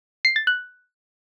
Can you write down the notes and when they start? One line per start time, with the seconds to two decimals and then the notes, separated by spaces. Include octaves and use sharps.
0.25 C7
0.36 A6
0.47 F#6